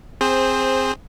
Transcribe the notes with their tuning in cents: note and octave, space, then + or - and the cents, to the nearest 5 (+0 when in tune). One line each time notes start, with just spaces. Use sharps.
C4 +0 G#4 -15 C5 +10